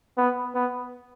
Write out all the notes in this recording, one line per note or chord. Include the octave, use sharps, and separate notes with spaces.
B3
B3